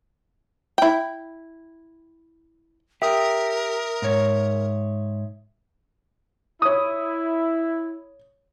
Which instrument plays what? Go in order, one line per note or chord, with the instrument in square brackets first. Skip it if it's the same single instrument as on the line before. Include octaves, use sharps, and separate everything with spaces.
[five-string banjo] E4 G5
[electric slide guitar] G4 [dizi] A#4 [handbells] E5 D#6
[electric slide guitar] G#2 C#5
[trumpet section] E4 [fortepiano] C#5 D#6